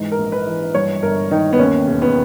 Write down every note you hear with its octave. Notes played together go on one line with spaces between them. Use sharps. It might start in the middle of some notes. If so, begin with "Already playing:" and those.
Already playing: G#2 E3
A#4
A#1
B4
E3
G2 C#5
G1 A#4
D#3 D#4
B3
D#2 C#4
E1
B3